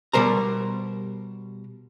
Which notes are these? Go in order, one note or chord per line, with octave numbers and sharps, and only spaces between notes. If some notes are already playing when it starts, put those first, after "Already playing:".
B2 G3 A#4 C5 A#5